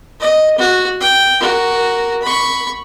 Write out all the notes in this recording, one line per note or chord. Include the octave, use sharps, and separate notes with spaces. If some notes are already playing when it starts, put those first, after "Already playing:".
D#5
F#4
G5
F#4 A#4
B5 C#6